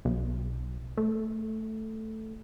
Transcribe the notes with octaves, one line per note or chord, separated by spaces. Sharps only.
B1
A3